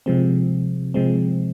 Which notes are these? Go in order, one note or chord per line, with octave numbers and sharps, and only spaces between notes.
C3 F3 G#3 C4
C3 F3 G#3 C4